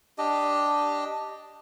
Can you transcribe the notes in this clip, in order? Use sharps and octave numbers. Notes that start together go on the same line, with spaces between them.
D4 G4 D#5